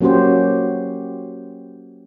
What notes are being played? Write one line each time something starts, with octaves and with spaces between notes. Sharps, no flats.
F#3 A#3 C#4 F#4 G4 C5